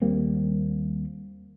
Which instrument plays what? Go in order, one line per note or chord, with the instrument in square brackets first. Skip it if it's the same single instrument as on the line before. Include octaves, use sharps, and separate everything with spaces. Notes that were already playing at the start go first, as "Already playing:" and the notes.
[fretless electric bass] D#2 G3 A#3 C4